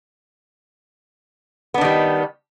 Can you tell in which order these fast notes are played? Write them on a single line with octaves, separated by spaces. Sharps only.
B3 D4 D#3 G3